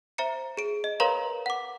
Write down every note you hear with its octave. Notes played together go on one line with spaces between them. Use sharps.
C5 E5 A#5 C#7
G#4 D7
D#5
A#4 B4 C#5 F5 A#5 C6
F#5 D6